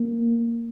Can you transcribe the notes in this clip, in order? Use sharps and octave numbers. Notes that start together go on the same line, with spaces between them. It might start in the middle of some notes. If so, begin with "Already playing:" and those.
Already playing: A#3